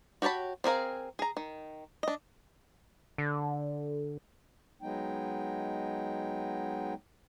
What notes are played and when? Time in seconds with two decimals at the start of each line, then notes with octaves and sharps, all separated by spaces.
0.22 F#4 G4 C#5 A5 B5
0.64 C4 G#4 A#4 F5
1.19 G#4 A#5
1.37 D#3
2.03 D4 D#5
3.18 D3
4.82 F#3 G#3 B3 D#4 G5